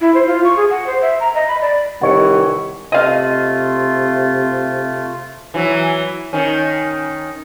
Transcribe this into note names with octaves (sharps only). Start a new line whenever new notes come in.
E4
C5
F4
C#6
G#4
F#5
C5
E5
A#5
D#5
B5
D5
C3 D#3 E3 G3 C#5 F#5 C#6 C#7
C3 A3 F4 D#5 F5
E3 F#3
D#3 C#4